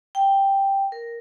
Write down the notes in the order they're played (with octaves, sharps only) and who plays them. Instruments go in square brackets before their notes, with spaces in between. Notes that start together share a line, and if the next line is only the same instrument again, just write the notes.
[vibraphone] G5
A#4